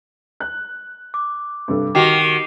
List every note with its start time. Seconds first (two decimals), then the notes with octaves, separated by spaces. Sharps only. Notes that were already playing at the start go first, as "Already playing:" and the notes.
0.40 F#6
1.14 D6
1.68 G2 C3 A4
1.95 D#3 F#4 G4 D6 C7 F7